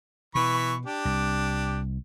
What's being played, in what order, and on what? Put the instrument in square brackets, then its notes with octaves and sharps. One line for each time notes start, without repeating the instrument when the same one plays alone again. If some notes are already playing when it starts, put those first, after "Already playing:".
[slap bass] B2 [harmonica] E3 B5 C#6
[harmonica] D4 G4
[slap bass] C2